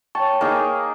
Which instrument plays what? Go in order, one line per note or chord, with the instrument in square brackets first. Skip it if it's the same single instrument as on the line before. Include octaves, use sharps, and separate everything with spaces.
[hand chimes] C#5 G5 C#6 [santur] A5
[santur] A#3 D#4 G#4